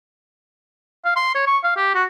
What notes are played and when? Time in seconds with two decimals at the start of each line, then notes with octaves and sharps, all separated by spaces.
1.05 F5
1.16 C6
1.35 C#5
1.47 C#6
1.64 F5
1.77 G4
1.95 F#4